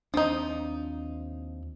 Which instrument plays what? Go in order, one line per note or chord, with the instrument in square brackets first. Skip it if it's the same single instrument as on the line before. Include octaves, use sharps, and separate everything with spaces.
[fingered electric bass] D#2 C4 D4 [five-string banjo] F3 D#4